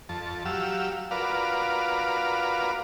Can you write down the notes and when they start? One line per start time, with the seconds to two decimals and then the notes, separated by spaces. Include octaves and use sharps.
0.09 F2 A5
0.45 F#3 G4 F5 E6
1.11 F4 F#4 A#4 B4 D5 F5